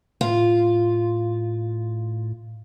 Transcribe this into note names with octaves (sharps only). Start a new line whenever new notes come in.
A2 F4